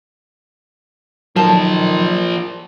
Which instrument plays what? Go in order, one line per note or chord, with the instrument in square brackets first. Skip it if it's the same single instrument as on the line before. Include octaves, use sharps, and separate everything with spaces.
[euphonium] D#3 [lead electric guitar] F3 A#4 [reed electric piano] F#3 [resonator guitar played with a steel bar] A4